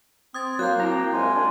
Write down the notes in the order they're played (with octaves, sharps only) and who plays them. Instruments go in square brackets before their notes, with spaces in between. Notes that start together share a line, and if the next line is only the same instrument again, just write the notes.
[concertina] C4 [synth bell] D#6 G#6 A6
[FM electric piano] F#3 [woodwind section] A#3 [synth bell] F#6 G6
[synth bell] C4 E4 [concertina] G5 [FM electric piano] A#5
[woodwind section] C2 F#2 G#5 [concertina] G#3 F4
[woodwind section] D4